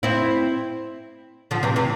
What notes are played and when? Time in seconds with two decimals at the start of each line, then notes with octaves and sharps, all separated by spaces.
0.03 C4 E4
1.51 D3 F3
1.63 C3 E3
1.76 C3 E3